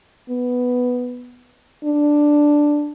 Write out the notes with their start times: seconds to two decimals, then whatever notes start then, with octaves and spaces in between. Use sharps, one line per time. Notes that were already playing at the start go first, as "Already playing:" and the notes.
0.30 B3
1.84 D4